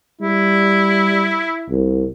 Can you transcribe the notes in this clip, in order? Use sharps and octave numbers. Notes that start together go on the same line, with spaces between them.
G3 E4
C2